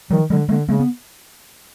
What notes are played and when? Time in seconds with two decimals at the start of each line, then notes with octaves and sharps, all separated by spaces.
0.11 D#3 F3 G3
0.30 D3 F#3 G#3
0.49 D3 G#3 A#3
0.69 C#3 G#3 A#3
0.80 B3